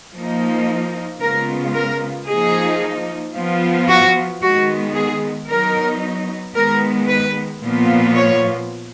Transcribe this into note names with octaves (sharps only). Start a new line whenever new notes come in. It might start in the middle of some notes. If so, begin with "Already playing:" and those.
F3 A#3 D#4
C#3 G#3 B3 F4 A#4
A#4
F3 A#3 D#4 G#4
F3 B3 F4
F#4
D#3 G#3 B3 F#4
G#4
F#3 B3 D#4 A#4
D#3 G#3 B3 A#4
B4
A#2 F3 B3 F4
C#5